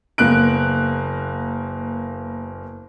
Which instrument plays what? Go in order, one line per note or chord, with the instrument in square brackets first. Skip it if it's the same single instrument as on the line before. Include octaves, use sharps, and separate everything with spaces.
[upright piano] F#1 A#3 B3 F#6 D7